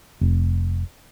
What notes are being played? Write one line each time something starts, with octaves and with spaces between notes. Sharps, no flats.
F1